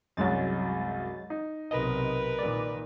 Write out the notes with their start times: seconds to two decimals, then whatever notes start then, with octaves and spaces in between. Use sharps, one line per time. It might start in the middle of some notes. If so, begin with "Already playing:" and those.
0.17 C2 F#2 F#3 G#3 A6
1.30 D#4
1.71 B1 C3 A#4 B4 D#5
2.39 A#2 D#3 D5